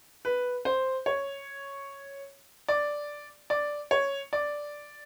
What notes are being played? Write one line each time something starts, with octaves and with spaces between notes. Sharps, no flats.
B4
C5
C#5
D5
D5
C#5
D5